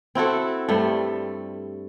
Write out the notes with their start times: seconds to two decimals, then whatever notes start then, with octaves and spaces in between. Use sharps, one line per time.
0.15 C4 E4 F#4 A4
0.69 G2 G3 A3